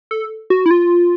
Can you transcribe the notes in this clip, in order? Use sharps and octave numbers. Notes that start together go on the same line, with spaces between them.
A4
F#4
E4
F4